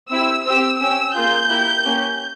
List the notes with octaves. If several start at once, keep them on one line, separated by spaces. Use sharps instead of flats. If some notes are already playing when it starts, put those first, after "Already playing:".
C4 E4 G4 E6
C4 G4 E6
C#4 G4 E6
A#3 F4 G#4 G6
A#3 E4 G4
A#3 C#4 G4